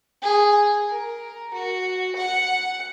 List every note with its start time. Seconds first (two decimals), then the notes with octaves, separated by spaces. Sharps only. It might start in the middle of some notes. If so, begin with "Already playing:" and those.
0.22 G#4
0.90 A#4
1.53 F#4
2.16 F#5